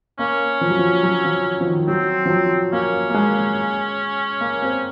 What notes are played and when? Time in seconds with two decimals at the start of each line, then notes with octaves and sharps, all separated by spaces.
0.19 A#3 C#4
0.61 F3
0.70 F#3
0.79 F3
1.03 F#3
1.25 F3
1.61 F3
1.66 D#3
1.88 F#3 C4
2.26 F3
2.30 F#3
2.72 A#3 C#4
3.10 A#3
3.14 G#3
4.41 A#3
4.62 C4